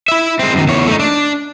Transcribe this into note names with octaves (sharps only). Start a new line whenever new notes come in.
E4 E5
G#3 C4
F#2 D#3
E2 C#5
A3 D#4
D4